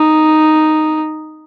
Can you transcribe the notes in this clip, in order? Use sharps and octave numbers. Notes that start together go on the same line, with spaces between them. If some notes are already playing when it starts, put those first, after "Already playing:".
Already playing: D#4